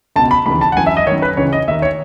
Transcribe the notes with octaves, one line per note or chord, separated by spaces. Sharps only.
C#2 B2 A5
B5
D#2 C#3 E3 B5
A5
F#5
F#2 E3 G#5
E5
D#5
F#2 D#3 C#5
B4
C#2 C#3 E3 C#5
D#5
D#2 D#3 E5
C#5